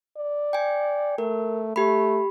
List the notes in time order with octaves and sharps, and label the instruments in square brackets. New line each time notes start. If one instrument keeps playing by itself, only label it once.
[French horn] D5
[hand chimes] G5 G#5
[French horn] A3 [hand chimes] A#4
[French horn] A3 [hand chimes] G4 B5